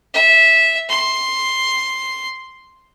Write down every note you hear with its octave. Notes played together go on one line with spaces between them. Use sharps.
E5
C6